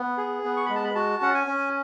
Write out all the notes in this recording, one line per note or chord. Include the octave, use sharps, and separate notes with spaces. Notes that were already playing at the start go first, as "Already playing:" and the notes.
Already playing: B3
G#4
B3
C#6
G#3 B5
A5
B5
F#4 A5
C#4 F#5
G#5
C#4